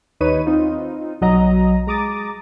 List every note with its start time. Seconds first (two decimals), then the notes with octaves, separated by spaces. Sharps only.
0.20 D#2 D#4 B4 C#5 D#7
0.46 C4 D#4 F4
1.21 B1 F#3 D#5 A#5
1.87 G#3 A#5 D6 D#6 A6